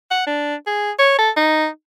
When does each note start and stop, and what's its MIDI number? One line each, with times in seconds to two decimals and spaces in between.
0.11 0.24 78
0.27 0.55 62
0.67 0.91 68
0.99 1.14 73
1.19 1.30 69
1.37 1.67 63